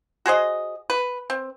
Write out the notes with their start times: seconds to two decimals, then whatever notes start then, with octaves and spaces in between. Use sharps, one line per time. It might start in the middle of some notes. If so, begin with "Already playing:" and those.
0.26 F#4 G#4 C5 D#5
0.90 B4
1.30 C4